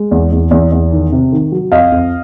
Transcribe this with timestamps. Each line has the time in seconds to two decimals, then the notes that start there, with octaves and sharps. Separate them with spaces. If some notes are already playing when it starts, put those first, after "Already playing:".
Already playing: G#3
0.11 E2
0.32 E2
0.51 E2
0.72 E2
0.92 D#3
1.12 C3
1.32 D#3
1.52 F#3
1.71 F2 D#5 F5
1.92 F2